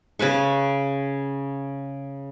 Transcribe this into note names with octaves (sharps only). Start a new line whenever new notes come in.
C#3 C#4 B4 C#6